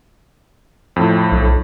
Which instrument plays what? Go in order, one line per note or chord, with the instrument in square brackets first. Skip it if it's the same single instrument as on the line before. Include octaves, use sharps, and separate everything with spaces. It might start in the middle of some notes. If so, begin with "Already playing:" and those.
[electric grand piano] F2 A2
[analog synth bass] B1